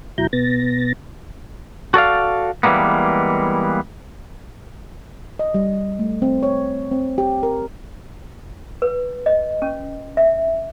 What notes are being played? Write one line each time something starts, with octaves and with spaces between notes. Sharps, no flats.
D#2 B2 F#3 E4 A#5 G6
B2 B3 A6 A#6
F#4 A4 D5 F5
E3 G3 G#3 A#3 B3
D#5
G3
A3
C4
C#5
C4
G4
A#4
B4
D#5
C#4
E5